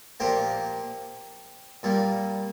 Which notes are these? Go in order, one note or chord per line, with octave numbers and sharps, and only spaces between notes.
A#2 F3 A#3 G4 C5
A#2 G3 A#3